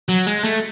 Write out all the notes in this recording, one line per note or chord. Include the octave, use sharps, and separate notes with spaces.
F#3
G#3
A3